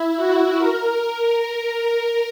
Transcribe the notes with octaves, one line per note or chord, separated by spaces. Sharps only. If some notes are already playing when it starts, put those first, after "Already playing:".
Already playing: E4
F#4
A#4